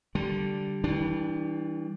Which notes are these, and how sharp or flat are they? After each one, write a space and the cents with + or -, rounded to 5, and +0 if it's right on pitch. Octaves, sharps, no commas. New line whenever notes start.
D3 +0 G3 -10
E3 -35 G3 +0 D4 +0